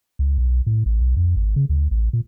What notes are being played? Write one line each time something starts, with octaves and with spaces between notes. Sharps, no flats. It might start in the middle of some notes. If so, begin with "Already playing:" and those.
C#2
B1
A2
A1
B1
F2
G#1
C#3
D2
A1
A#2